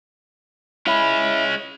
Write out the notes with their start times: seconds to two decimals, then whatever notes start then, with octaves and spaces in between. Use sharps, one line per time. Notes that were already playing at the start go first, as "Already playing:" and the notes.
0.86 G#3 C#4 E4